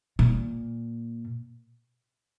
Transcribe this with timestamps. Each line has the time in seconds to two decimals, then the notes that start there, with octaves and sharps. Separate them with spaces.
0.19 A#2